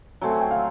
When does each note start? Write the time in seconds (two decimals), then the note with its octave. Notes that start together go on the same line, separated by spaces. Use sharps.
0.21 F#3 A3 C4 G#5
0.31 G#5
0.41 G5
0.51 F5